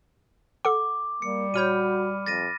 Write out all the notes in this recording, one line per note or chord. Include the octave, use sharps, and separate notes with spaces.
A4 F#5 D6
G3 A#3 C#7
A#2 F#4 C#5 B5 F6 G6 D#7
F2 A6 A#6 D#7